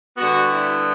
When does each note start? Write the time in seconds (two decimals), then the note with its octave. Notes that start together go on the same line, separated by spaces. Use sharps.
0.16 D3 G3 B3 F#4
0.49 E4